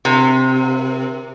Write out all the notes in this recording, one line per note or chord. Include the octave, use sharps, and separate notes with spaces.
C3